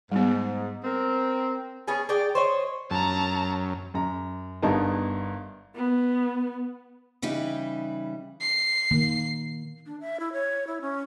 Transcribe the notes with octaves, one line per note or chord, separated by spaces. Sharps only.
G#2 G3 B3
C4 A#4
B3 C#4 G#4
G#4 D5 G5 A#5
C5 C#5 D#5
F#2 A5 A#5
F#2 A#5
G1 G2 B3 D#4 A#4 A5
B3
C#3 E3 G3 D#4 E4
C7
D#3 A#3
D4
E5
E4
C#5
E4
C#4